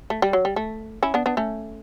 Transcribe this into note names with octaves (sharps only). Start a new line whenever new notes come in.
A3
G3
F#3
G3
A3
C#4 E4
B3 D4
B3 D4
A3 C#4